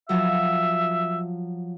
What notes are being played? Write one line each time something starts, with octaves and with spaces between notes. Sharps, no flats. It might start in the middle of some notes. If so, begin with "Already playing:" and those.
F3 F#3 E5